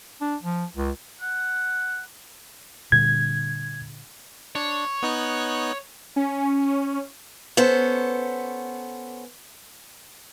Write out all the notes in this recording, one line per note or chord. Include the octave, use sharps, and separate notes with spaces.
D4
F3
C#2
F#5
A#2 D3 G3 G#6
D4 C#5
B3 D#4 F#6
C#4
B3 C#4 A4 C5